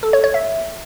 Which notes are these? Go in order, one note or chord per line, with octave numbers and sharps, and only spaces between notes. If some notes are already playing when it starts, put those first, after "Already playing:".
A4
C#5
C#5
E5